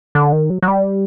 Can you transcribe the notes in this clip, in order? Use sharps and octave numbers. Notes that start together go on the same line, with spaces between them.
D3
D#3
F#3
F#3
G3